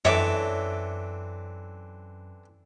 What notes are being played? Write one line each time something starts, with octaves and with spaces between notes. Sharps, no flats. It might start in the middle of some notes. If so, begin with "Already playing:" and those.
F#2 D3 E3 C4 C#5 E5 D6